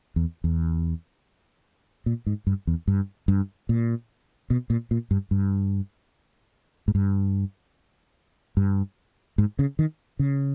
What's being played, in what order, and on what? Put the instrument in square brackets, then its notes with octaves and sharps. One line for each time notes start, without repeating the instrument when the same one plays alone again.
[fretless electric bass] E2
E2
A#2
G#2
G2
E2
G2
G2
A#2
B2
A#2
A#2
G2
G2
G#2
G2
G2
G#2
C#3
D#3
C#3